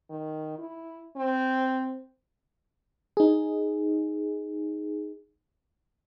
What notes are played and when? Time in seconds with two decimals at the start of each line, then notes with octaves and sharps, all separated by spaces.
0.10 D#3
0.59 E4
1.16 C4
3.17 D#4 G#4